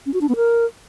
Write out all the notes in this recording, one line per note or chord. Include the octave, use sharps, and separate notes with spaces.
C#4
F#4
D4
B3
A#4